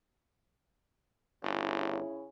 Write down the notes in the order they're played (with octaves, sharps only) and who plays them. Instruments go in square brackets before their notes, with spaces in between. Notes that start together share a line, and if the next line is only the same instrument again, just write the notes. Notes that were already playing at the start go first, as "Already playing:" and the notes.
[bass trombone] G1 [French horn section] C#3 C#4 E4